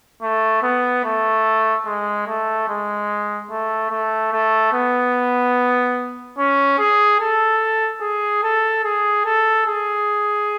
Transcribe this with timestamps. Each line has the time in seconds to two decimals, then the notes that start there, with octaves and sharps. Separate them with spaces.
0.22 A3
0.63 B3
1.04 A3
1.86 G#3
2.27 A3
2.68 G#3
3.50 A3
3.91 A3
4.32 A3
4.73 B3
6.38 C#4
6.79 G#4
7.20 A4
8.01 G#4
8.43 A4
8.84 G#4
9.25 A4
9.66 G#4